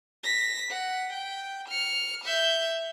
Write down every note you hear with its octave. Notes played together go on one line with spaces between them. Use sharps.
A#6 B6
F#5
G5
F6 C#7
E5 G6